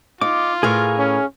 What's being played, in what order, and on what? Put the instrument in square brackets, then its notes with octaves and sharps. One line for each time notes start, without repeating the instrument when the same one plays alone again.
[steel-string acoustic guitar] D#4 [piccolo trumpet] F4 [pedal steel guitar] D6
[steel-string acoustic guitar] A2 A#4 B4 [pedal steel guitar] G#4 F5 C#6
[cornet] C#4